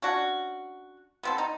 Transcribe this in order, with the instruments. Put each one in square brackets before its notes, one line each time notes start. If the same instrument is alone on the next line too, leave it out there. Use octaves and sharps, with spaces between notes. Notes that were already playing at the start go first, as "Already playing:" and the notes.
[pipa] C#4 D4 F#4
B3 C4 A4
D#4